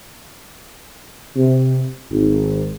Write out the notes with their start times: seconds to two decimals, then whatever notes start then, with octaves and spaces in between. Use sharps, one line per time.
1.36 C3
2.12 G#1